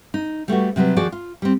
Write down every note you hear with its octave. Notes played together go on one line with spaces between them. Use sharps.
D#4
G3 A3 B3 F#4
C3 F#3 G3 B3
D#2 F3 F#4 G#4 D5
F4
G3 C4